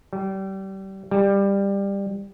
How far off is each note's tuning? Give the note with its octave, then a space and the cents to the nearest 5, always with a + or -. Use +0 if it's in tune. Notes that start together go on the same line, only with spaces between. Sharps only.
G3 -30
G3 +15